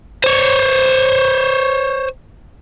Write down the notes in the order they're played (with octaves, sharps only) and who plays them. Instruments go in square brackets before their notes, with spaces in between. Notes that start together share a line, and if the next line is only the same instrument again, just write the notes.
[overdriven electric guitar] C5 C#5